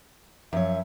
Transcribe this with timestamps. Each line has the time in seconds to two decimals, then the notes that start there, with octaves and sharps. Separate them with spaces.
0.53 F#2 F3 C#5 E5